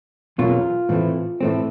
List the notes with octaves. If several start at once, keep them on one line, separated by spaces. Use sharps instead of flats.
E2 B2 F#3 A#3 C#4 F4
A2 E3 A3 C4
A2 E3 A3 C4